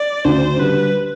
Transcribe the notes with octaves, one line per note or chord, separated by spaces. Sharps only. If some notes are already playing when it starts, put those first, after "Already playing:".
Already playing: D5
D2 C5
D3 G3 B4